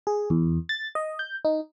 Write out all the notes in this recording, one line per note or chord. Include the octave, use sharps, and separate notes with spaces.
G#4
E2
A6
D#5
G6
D#4